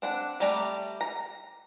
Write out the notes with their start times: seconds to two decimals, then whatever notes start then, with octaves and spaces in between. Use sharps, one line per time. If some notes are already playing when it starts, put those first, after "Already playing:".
0.02 C4 D4 F#5
0.40 G3 A3 D5 A#5
1.01 A#5